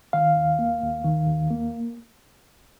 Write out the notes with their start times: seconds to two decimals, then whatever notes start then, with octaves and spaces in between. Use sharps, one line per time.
0.13 D#3 F5
0.37 D#2
0.59 A#3
0.82 D#2
1.05 D#3
1.27 D#2
1.51 A#3